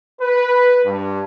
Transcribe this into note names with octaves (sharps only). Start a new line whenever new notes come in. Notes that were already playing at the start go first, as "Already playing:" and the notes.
B4
G2